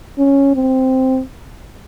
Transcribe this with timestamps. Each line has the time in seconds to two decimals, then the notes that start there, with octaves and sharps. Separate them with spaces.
0.18 C#4
0.55 C4